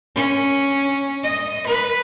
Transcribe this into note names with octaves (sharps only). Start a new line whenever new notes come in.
C#4
D#5
B4